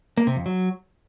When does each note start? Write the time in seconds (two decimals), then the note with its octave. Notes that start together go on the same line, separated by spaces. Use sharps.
0.17 A#3
0.27 C3
0.36 F2
0.46 F#3